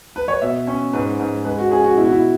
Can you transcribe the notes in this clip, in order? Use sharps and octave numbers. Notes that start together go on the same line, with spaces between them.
B4
C#5
B2 E5
C#4
G#2 B4
G#2
G#3 B4
F#4
C#4 G#4
F#4
B2 E4
F#4
E4